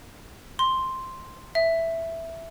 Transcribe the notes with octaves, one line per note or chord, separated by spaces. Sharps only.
C6
E5